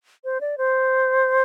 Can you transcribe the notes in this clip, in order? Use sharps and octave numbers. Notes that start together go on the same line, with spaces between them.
C5
D5
C5